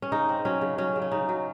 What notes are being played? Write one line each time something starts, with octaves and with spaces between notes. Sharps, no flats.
C#4
C#3 D#4
C4
F#3 C#4
C#3
F#3 C#4
C#3
C#4
C#3 D#4
F#3